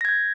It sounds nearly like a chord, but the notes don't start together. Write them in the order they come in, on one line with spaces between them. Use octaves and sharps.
A#6 G#6 G6